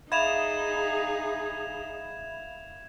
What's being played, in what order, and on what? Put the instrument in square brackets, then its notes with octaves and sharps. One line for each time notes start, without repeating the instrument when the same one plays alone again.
[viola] D#4 G#4 [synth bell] E5 F5 B5 [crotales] G#6 E7 F7